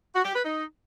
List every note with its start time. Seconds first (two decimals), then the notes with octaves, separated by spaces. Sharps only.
0.15 F#4
0.25 G4
0.34 B4
0.44 D#4